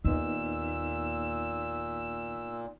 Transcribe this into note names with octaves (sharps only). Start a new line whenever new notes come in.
D#2 A#2 B3 D#4 E6